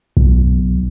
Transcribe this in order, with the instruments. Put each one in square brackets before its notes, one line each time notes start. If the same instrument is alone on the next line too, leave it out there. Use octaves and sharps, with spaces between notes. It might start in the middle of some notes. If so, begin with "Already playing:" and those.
[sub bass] B1